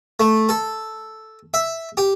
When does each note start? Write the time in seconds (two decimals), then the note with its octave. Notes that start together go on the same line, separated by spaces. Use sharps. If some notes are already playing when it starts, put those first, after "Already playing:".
0.20 A3
0.49 A4
1.54 E5
1.97 G4